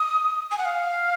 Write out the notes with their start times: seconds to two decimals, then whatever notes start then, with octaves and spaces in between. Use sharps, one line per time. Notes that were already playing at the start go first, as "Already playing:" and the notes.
Already playing: D#6
0.51 G#5
0.58 F#5
0.65 F5